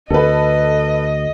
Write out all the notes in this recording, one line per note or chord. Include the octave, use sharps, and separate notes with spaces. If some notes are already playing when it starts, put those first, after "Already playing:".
D2 A4 B4 D#5